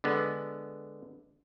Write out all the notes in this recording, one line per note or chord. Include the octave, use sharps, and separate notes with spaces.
D3 G#3 B3